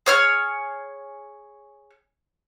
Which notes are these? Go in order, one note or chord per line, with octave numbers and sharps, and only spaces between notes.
G#4 C#5 F6